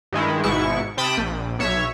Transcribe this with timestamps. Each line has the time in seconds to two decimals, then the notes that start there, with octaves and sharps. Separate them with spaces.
0.12 G2 D#3 G#3 E4
0.44 G#1 G#2 B2 E4 C#6
0.97 C3 G5 A5 B5 D#6
1.17 A#1
1.59 B1 C#5 E5 C#6